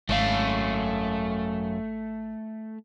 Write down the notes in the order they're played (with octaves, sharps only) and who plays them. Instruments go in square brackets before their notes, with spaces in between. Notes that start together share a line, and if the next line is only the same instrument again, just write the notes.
[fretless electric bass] G#1 [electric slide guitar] F#2 C#4 F5 [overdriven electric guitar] A3